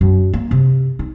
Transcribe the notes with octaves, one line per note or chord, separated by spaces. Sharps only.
F#2
A#3
C3
D#4